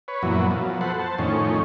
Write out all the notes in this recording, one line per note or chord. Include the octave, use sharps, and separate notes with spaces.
B4 C#5
F#2 A#2 E3 F#3 B3
B2 F3 F#3
A4 B4 C5 F#5
C5 A5
F2 A2 D#3 C#4